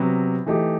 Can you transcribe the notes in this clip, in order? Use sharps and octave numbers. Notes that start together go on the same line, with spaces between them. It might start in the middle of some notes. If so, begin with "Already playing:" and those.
Already playing: C3 F#3 B3
E3 A3 D#4 G4